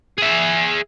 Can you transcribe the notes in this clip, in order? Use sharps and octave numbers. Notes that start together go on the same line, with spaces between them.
G#4 E5